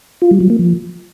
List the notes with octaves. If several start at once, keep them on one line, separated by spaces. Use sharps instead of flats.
F4
G3
F#3
A#3
F3